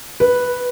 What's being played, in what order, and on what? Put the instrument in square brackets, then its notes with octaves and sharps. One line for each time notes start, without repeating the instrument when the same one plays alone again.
[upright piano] B4